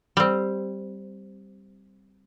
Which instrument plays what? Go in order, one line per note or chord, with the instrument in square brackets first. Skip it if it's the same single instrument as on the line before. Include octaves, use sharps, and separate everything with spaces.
[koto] G3 C4